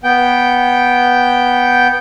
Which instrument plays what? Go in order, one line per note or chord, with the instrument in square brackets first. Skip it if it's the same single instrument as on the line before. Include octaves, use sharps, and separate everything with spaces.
[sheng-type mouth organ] B3 G5